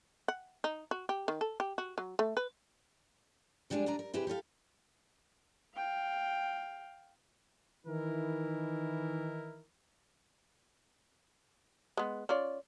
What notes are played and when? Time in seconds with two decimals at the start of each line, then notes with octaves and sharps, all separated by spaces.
0.28 F#5
0.64 D#4
0.91 F#4
1.09 G4
1.28 D#3
1.41 A4
1.60 G4
1.78 F#4
1.98 F#3
2.19 A3
2.37 B4
3.70 F2 G3 G#3 D4 D5 G#5
3.86 D2 D4 D5 G#5 A#5
3.99 A#4
4.14 C3 E4 G4 G#4 B4 C5
4.27 G4 A4 C5 F5
5.75 F5 G5
7.86 D#3 E3 D#4 E4 A#4
11.97 G#3 B3
12.29 C#4 F4 D5